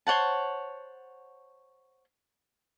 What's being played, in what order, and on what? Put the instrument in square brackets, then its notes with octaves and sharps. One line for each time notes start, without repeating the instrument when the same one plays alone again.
[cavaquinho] C5 C#5 F#5 A5